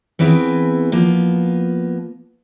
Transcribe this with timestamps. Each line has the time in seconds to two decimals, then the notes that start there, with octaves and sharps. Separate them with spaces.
0.19 E3 B3 C4 G#4 B4
0.92 F3 A#3 B3